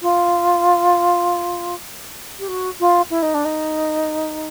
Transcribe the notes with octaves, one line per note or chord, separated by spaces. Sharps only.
F4
G4
F#4
F4
E4
D#4
D4
D#4